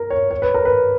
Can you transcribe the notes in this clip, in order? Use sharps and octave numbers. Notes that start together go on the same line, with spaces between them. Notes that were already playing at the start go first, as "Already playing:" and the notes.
Already playing: A#4
C#5
C#5
B4
A#4
B4